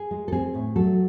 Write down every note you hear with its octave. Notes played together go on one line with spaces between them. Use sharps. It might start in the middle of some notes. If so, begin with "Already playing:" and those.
Already playing: G#4
G#3
A4
C4 G#4
A2
F#3 A4